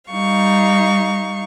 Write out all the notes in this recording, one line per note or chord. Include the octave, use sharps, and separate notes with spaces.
G3 D#4 F5 C#6